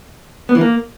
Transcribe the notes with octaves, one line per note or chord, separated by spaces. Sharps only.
B3
E3
A#3